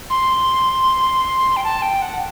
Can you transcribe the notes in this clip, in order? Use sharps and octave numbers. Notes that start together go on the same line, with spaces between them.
C6
G5
A5
G5
F#5